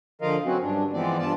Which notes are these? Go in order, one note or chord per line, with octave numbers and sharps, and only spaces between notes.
D3 F3 F4 A#4 D#5 F5
F#3 C4 C#4 F#4
G2 D4
E3 F3 G#3 B3 C4 D5
G2 F4 D5 A5